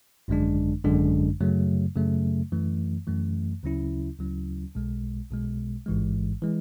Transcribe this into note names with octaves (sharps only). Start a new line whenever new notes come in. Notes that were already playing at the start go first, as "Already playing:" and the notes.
G#1 F#2 D3 G#3 D4
G#1 F#2 D3 G#3 D4
F#2 C#3 F#3 A3
F#2 C#3 F#3 A3
F#2 E3 A3
F#2 E3 A3
D2 C#3 F#3 C#4 E4
D2 C#3 F#3 C#4 E4
B1 B2 G#3
B1 B2 G#3
A1 G#2 E3 G#3
E3 G#3